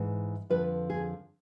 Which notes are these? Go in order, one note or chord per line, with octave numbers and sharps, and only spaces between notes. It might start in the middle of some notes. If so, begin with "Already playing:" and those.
Already playing: G#2 E3
F2 D3 F3 B4
G#4